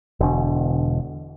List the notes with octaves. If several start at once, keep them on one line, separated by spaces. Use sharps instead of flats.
E1 D3